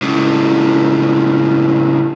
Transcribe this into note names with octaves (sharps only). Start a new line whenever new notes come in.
C#2 A2